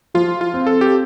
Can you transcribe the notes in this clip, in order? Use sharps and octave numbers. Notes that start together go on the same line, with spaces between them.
F3 F4
F4
C4
A4
G4